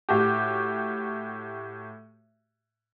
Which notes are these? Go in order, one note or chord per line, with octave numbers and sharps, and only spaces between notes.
A2 F#4 G4